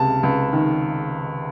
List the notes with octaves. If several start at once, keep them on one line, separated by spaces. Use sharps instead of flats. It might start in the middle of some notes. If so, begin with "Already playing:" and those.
Already playing: C#2 C3 A5
C#2
D#3